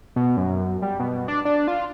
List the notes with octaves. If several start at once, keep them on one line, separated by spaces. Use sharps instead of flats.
B2
F#2
G3
B2
D4
D4
F4